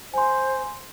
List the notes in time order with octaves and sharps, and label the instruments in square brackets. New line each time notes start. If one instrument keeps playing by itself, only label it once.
[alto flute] C5 [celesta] G#5 C6